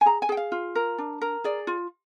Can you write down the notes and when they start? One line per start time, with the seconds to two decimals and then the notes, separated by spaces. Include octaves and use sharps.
0.01 G#5
0.06 G#4 A#5
0.22 G#5
0.29 G#4 G5
0.37 F5
0.52 F4
0.75 A#4
0.98 D4
1.21 A#4
1.44 G#4 D5
1.67 F4